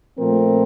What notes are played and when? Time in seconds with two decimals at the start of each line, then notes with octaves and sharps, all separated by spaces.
0.19 A#2 F3 A3 C4 A#4